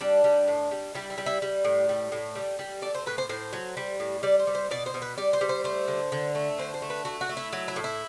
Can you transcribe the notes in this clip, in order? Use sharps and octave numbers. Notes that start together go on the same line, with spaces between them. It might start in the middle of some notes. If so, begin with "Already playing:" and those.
G3 D4
G3
A2
G3
G3 E4
E4
G3
E4
G3
A2
G3
A2
G3
G3
A3 D5
C5
A2 B4
C5
A2 C5
F#3
G3
A2
G3 D5
C5
G3
C5
B2 D5
C5
B2
B4
G3 D5
C5
G3
C5
A3 C5
D3
D3
A3
D3 C5
C5
A3
B4
A3 F#4
F#4
A3
E4
F#3 E4
E4
A2
E4